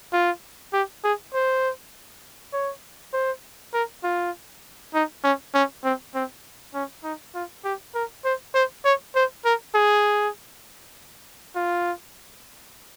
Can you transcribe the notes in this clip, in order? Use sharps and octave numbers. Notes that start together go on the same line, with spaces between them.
F4
G4
G#4
C5
C#5
C5
A#4
F4
D#4
C#4
C#4
C4
C4
C#4
D#4
F4
G4
A#4
C5
C5
C#5
C5
A#4
G#4
F4